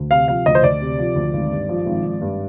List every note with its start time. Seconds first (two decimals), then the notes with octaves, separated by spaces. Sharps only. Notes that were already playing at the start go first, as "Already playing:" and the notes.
Already playing: D2
0.10 C3 F5
0.28 F3 F5
0.46 D2 D#5
0.55 C5
0.63 D2 D5
0.81 C3
0.99 F3
1.16 D2
1.33 G#1
1.51 G2
1.69 F3
1.86 G#1
2.05 G#1
2.21 G2